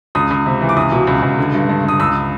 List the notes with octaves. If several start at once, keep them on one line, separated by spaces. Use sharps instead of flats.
C#2 D#6
C#2
C3
E3
D6
C#2 D#6
B2
C#2
C#2
D3
G2
G2
G2 D#6
C#2 E6